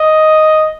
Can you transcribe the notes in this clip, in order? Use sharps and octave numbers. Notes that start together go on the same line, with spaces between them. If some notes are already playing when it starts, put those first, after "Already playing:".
Already playing: D#5